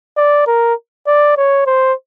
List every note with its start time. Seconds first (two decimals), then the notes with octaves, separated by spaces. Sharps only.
0.17 D5
0.47 A#4
1.07 D5
1.37 C#5
1.66 C5